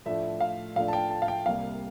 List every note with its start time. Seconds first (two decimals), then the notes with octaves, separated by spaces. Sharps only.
0.06 A2 F3 A3 D4 E5
0.40 F5
0.76 A2 F3 A3 D4 F5
0.88 A5
0.93 G5
1.10 A5
1.22 F5
1.28 G5
1.46 C2 C3 G3 A#3 F5